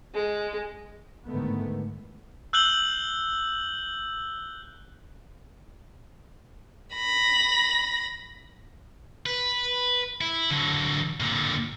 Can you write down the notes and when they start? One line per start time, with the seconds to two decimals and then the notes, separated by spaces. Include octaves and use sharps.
0.14 G#3
1.27 G#2 D3 D#3 G#3 A3 B3
2.53 E6 F#6 G6 F#7 G7
6.95 B5 A#6
9.26 B4
10.21 E4
10.50 D3 F#3
11.20 A#2 D3